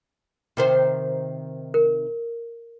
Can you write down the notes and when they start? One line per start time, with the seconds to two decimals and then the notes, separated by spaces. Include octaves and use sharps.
0.57 C3 D#3 C5
1.74 A#4